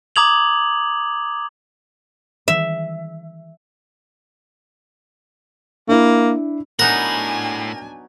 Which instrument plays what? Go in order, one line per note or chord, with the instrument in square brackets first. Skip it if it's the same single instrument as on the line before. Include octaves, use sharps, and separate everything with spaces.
[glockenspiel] A#5 D6 D#6 G#6 F7 F#7
[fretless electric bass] D#3 E3 G3 [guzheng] E5
[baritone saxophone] A#3 [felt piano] D4 E4
[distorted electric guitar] A2 B5 [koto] F#3 B3 D#4 [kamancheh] D4 G#5 [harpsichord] A#4